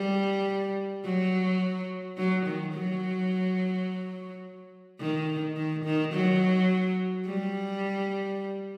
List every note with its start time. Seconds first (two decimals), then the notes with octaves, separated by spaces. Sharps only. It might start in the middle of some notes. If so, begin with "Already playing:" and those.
Already playing: G3
1.05 F#3
2.18 F#3
2.46 D#3
2.74 F#3
5.00 D#3
5.56 D#3
5.85 D#3
6.13 F#3
7.26 G3